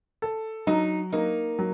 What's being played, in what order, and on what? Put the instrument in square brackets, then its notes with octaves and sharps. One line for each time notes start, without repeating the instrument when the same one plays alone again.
[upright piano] A4
[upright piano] F#3 [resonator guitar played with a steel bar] D#4
[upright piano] A#3 [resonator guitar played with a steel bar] D#4
[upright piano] F#3